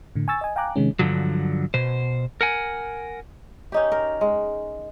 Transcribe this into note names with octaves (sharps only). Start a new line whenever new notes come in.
A2 D3
G#5 C#6 E6 A6
D#5 G#5
F5 G5 G#5 A#5 D6 F#6
C3 D#3 G#3 C#4
G2 D3 F3 F#3
B2 C5
A#4 F#5 G#5
C#4 D#4 G4
A#4
G#3